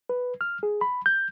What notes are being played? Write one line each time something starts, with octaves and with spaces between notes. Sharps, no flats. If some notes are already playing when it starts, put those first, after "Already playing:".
B4
F6
G#4
B5
G6